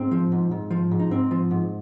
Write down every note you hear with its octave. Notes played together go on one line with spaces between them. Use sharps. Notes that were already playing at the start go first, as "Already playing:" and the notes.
Already playing: G#2 C4
F3
G#2
G#2
F3
G#2
D#4
G#2 C4
F3
G#2